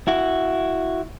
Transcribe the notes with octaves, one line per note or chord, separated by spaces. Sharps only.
E4 F#4